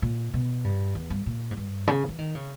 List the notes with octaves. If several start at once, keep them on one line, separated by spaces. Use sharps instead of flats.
A#2
B2
G2
E2
G2
A#2
G#2
G2
C#3
E3
D#3
C#3